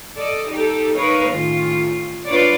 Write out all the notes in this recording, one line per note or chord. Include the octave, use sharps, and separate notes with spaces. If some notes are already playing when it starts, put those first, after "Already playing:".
A4 D5 D#5
D#4 G4 A4
D#4 A#4 B4 C#5 D#5 F5
A2 D#3 C#4 F4
D4 F4 B4 C#5 D5